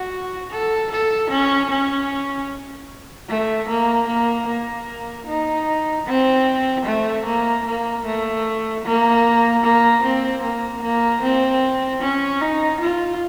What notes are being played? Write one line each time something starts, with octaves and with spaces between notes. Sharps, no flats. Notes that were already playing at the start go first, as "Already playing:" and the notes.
Already playing: F#4
A4
A4
C#4
C#4
A3
A#3
A#3
A#3
D#4
C4
A3
A#3
A#3
A3
A#3
A#3
C4
A#3
A#3
C4
C#4
D#4
F4